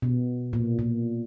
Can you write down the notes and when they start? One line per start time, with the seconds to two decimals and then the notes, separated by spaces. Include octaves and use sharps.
0.02 B2
0.53 A#2
0.79 A#2